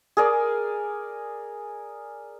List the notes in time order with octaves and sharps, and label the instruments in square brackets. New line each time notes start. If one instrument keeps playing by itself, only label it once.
[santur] G#4 A#4 D5